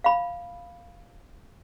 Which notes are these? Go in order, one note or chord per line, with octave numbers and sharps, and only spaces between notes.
F5 B5